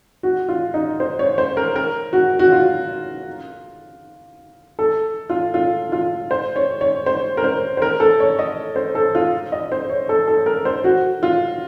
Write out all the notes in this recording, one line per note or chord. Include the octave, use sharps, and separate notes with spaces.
F#4
F4
D#4
C5
C#5
C5
A#4
A#4
F#4
F#4
F4
A4
F4
F4
F4
C5
C#5
C#5
C5
A#4
C5
C5
A#4
A4
C#5
D#5
C5
A4
F4
D#5
C5
C#5
A4
A4
A#4
C5
F#4
F4